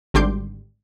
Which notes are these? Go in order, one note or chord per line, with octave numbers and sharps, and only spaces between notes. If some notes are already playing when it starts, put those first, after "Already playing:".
G#1 D3 G3 C6 D6 G6